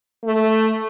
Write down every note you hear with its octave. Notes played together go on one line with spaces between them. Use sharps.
A3